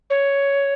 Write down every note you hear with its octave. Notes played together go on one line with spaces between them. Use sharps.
C#5